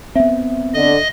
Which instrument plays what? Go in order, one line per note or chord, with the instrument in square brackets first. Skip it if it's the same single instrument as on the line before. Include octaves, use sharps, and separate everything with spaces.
[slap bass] B3 C4 [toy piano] E5
[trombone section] D3 [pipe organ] D#5